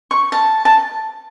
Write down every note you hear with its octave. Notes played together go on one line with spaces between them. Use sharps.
C#6
A5
A5